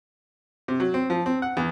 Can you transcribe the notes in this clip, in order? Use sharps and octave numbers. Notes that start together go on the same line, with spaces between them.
C3
F#3
C4
F3
C4
F#5
E2